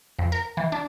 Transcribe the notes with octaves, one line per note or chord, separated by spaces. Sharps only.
F2
A#4
E3
D4